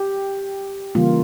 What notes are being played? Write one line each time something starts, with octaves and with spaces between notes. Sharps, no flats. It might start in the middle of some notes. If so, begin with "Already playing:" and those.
Already playing: G4
C#3 E3 G3 A#3 F4